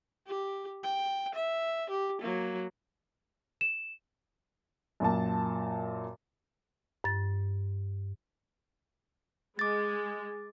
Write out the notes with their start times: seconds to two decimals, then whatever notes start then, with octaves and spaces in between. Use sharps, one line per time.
0.27 G4
0.84 G5
1.35 E5
1.90 G4
2.22 F#3 A#3
3.61 E7
5.00 F#2 A#2 A5
7.04 G2 A6
9.59 G#3 D6 A6